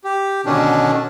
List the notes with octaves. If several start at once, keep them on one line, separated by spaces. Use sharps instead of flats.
G4
B2 D3 D#3 C#4 D4